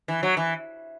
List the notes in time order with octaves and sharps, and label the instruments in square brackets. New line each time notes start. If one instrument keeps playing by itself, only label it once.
[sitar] E3
F#3
E3